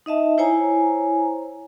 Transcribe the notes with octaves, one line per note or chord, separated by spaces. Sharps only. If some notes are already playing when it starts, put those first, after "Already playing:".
D#4 D#5 E5 A5
E4 C5 C#5 G#5 A#5